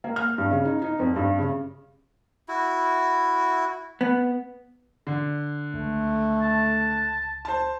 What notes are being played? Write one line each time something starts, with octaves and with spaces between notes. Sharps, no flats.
A#3
F6
G2
C#3
D#4
D#4
F2
G2
C#3
E4 F#4
B3
D3
C#2 A3
A5
C5 A5